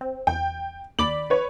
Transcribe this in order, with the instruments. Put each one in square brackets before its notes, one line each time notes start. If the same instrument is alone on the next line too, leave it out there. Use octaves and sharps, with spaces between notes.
[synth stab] C4
[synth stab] E2 [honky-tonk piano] G5
[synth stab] D#2 D5 B5 [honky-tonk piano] F#7
[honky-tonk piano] B4 C#5